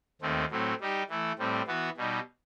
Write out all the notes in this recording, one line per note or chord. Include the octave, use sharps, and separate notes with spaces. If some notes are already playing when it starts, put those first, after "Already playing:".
D#2 D#3 A3 C4
A2 F#3 A3 C4
G3 D#4 G4
E3 A3 E4
A2 G3 C4
E3 B3 F#4 B4
B2 G3 D#4